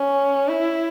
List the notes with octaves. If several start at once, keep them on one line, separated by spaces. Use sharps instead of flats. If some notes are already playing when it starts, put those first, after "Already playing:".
Already playing: C#4
E4